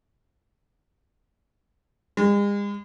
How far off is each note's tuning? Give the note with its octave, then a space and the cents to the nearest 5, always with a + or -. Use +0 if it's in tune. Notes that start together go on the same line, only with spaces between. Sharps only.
G#3 -40